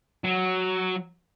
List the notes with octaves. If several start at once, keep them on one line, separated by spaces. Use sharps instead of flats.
F#3